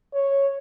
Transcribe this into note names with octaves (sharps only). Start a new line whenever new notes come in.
C#5